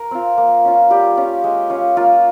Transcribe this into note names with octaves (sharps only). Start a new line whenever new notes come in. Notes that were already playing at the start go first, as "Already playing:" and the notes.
Already playing: A#4
C4 F4
A#3
C#4 F4
G3 G4
C#4 F4
G#3
C#4 F4
A#3 F4